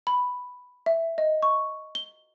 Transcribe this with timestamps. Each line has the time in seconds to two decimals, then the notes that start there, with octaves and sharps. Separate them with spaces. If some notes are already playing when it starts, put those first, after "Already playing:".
0.07 B5
0.86 E5
1.18 D#5
1.43 C#6
1.95 G7